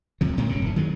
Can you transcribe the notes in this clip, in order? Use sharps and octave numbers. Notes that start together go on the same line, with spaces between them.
C#2 C3 F3
A2 C#3 G#3 C4
F1 F#2 A#2 C#3
D#1 E3
D#3 F#3 G#3